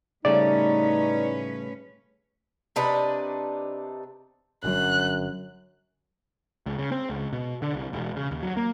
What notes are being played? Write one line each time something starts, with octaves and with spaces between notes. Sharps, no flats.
A2 C#3 G3 A3 C#4 D#4 B4 D5
C3 D4 D#4 B4
G1 F#2 D3 F#3 F#6
C#2
C#3
C4
C#2
B2
D3
C2
E1
C#3
D#2
F#3
A#3